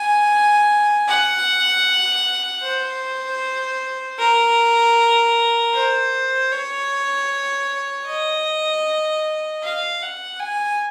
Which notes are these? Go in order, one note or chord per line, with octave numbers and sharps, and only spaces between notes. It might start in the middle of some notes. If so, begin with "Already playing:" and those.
Already playing: G#5
F#5
C5
A#4
C5
C#5
D#5
F5
F#5
G#5